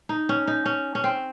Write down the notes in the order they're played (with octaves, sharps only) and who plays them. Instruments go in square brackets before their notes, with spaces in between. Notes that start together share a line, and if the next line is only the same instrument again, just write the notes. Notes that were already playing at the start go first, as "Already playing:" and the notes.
[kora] D#4
C#4
D#4
C#4
C#4
C4